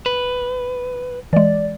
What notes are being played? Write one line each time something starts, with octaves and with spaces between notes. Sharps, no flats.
B4
E3 G#3 D5